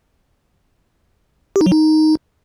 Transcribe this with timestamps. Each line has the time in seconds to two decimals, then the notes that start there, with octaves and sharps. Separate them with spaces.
1.56 G4
1.61 D#4
1.66 F#3
1.72 D#4